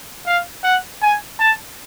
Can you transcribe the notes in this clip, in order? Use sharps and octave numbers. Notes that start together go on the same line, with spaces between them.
F5
F#5
G#5
A5